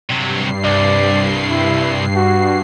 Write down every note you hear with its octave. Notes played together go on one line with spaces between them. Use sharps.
G2 C3 F#3 C7
C2 D5
E4
F#4